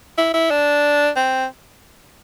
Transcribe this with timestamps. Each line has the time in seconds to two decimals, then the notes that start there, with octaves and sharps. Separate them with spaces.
0.18 E4
0.34 E4
0.50 D4
1.16 C4